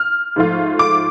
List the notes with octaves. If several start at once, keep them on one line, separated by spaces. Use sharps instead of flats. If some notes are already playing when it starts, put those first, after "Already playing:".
Already playing: F6
G#2 F3 A3 F4
D6